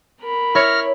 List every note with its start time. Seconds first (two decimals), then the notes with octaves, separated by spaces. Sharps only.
0.21 A#4 B5
0.55 E4 C#5 F6 A#6